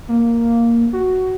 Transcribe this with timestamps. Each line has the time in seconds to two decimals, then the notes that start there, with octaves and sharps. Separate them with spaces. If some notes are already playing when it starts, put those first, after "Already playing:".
0.08 A#3
0.93 F#4